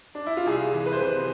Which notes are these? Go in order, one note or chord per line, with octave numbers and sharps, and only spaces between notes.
D4
E4
F4
C2 G#4
E3
B4
C5
C3 B4